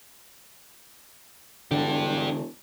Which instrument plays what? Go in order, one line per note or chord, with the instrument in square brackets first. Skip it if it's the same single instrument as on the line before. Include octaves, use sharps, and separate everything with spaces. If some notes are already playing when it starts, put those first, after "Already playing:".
[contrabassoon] E1 [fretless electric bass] D3 [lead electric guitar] D4 G4